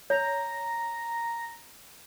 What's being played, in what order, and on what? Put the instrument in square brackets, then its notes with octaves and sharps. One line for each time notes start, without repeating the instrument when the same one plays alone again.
[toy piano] C#5 [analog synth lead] A#5